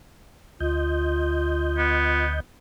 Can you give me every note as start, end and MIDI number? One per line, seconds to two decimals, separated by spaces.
0.60 2.40 38
0.60 2.24 65
0.60 2.40 75
0.60 2.40 91
1.78 2.38 59